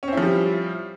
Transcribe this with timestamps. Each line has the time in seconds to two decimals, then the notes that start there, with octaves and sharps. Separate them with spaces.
0.03 C#4
0.08 C4
0.13 E4
0.17 F3
0.22 G3